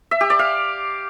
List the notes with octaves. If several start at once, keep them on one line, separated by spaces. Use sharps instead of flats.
E5
G4
D5
F5